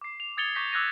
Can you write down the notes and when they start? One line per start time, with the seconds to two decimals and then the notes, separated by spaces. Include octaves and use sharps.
0.01 D6 C7
0.20 F7
0.37 D#6 G#6 A6 C#7 F7 G7
0.55 C#6 D6 G6 G#6 A#6 B6
0.72 D6 E6 F#6 G#6 A#6 D#7